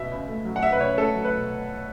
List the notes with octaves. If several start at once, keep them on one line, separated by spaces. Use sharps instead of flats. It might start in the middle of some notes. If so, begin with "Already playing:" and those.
Already playing: B2 E5
C#2
A3
F#3
F#5
B2 E5
B4
C#2 C#5
A3 A4
F#3
B4
B2